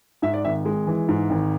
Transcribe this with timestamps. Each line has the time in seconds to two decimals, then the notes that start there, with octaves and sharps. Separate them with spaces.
0.22 G#2 E5
0.34 D5
0.45 G#1 E5
0.65 G#3
0.87 E3
1.09 G#2
1.30 G#1